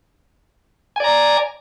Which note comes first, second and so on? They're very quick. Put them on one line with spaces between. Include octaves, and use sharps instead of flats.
G#5 D5 A#5